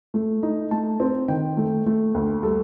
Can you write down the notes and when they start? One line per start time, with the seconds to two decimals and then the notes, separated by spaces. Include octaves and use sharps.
0.14 A3
0.43 D#4
0.71 A3 A5
1.00 C4
1.28 D#3 G5
1.57 A3
1.86 A3
2.14 D2
2.43 G3 A4